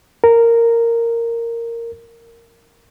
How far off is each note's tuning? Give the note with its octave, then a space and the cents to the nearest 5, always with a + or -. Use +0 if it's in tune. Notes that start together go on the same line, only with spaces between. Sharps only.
A#4 -10